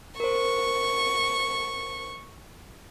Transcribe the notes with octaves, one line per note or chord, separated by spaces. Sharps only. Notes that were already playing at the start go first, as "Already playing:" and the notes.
A#4 C5 C#6